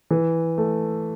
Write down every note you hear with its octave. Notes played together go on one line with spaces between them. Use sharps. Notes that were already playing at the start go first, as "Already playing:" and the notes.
E3
A3